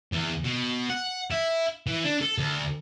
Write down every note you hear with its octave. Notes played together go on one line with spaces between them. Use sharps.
E2
B2
F#5
E4
E3
D4
A4
D2